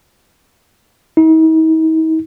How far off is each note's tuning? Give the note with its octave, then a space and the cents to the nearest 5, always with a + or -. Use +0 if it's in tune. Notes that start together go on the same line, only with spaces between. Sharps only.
D#4 +45